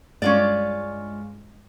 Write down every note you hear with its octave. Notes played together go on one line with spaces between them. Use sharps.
G2 G#3 C#4 F4 D5